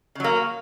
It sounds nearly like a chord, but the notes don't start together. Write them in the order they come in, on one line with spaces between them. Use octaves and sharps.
C#3 F#3 A#3